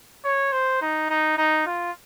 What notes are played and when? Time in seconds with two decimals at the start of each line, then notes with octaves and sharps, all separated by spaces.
0.25 C#5
0.52 C5
0.81 D#4
1.10 D#4
1.37 D#4
1.66 F4